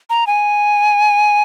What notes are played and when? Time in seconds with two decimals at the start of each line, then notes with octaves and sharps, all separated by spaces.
0.10 A#5
0.27 G#5